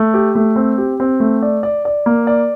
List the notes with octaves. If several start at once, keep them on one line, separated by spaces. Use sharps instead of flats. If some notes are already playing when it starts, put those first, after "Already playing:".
Already playing: A3
G4
A3
C4
G4
C4
A3
D5
D5
D5
A#3
D5